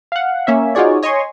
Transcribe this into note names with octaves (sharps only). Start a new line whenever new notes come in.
F5 F#5
A#3 C#4 E5
D#4 F4 F#4 G#4 C#5 D5
C#5 D#5 G#5 C6 C#6